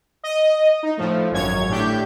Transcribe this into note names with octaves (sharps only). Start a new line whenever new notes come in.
D#5
D#4
A2 F3 A3
G#1 F#2 C#5 G#6
A2 D4 G4 G6